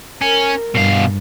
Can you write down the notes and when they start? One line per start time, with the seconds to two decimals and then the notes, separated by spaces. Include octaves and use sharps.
0.22 C#4 A#4
0.75 G2 B2 F5